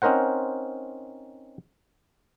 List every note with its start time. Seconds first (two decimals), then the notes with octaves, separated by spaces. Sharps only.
0.02 C4 C#4 D#4 A#4 C5 F#5